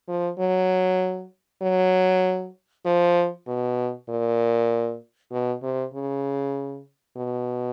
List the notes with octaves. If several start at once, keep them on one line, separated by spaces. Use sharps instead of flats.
F3
F#3
F#3
F3
B2
A#2
B2
C3
C#3
B2